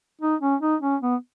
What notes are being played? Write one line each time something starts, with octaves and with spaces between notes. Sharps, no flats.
D#4
C#4
D#4
C#4
B3